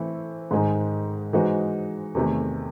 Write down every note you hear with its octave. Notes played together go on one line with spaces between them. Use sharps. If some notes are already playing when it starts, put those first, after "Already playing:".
Already playing: E3 A3 C4 E4
G#2 D#3 G#3 D#4 G#4
E3 G#3 D#4 F#4 C5
E2 C3 D#3 A3